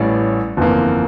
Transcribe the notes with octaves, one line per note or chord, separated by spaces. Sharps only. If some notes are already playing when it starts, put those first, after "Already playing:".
Already playing: A1 A2 G3 C#4 D5
G1 F2 E3 A#3